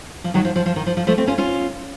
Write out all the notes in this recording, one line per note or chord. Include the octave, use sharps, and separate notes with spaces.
F3
D#3 F#3
F3
F3
F3
D#3
F3
F3
F3 A3
A3 C4
C#4 F4
C#4 F4